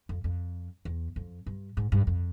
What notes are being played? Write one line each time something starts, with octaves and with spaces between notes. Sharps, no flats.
F2
F2
E2
F2
G2
G#2
G2
F2